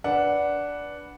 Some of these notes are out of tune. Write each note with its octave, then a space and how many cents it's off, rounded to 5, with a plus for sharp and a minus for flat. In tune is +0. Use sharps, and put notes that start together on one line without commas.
D4 -10 B4 -5 F#5 +0